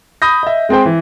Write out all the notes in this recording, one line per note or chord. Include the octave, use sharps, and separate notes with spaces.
B5 D#6 G6 A#6
D#5 E5
G#3 C4 G#4 C5 G5
E3